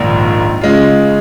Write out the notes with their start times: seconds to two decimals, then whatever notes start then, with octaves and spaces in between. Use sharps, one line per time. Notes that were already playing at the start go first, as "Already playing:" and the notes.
Already playing: A#1 G#2 D#3 A#3
0.61 C#3 G#3 F4